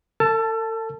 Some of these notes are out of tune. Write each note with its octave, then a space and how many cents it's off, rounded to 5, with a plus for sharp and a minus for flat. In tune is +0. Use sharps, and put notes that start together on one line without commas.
A4 +40 A5 +0 E6 +35